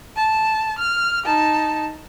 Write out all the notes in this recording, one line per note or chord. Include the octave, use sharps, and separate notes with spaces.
A5
F6
D#4 A5